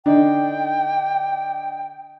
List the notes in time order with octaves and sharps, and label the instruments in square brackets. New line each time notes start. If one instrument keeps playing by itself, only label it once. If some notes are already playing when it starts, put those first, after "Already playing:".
[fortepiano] D3 D4 D#4 [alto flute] G5